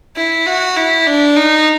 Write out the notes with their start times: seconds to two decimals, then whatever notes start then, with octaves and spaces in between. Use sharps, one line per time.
0.16 E4
0.46 F#4
0.76 E4
1.06 D4
1.36 D#4